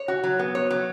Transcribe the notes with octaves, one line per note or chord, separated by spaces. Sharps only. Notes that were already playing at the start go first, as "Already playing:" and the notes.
Already playing: C#5
F#4
F#3
B3
C#5
F#3